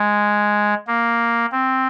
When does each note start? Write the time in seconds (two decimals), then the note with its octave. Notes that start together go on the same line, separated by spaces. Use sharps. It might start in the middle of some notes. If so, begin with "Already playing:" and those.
Already playing: G#3
0.87 A#3
1.52 C4